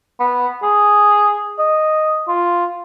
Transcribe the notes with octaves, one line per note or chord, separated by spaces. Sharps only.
B3
G#4
D#5
F4